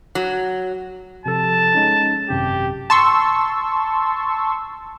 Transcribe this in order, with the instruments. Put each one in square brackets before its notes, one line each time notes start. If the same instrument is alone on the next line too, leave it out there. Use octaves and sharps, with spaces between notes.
[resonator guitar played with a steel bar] F#3
[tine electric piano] C3 F3 A4 [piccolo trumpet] A5
[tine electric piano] G#3 C#4 D#4
[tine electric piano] G#1 F#2 C3 [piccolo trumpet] G4
[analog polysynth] A5 C6 C#6 E6